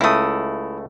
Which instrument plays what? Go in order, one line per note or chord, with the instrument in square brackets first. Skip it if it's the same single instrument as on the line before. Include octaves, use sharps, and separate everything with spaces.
[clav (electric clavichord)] C#2 A3 [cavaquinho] E4 D#6